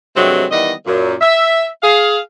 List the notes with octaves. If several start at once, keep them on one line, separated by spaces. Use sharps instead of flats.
G2 C3 F#3 G#3 A3 C4
D#3 E3 G3 B3 D#5
F#2 A#2
E5
G#4 F5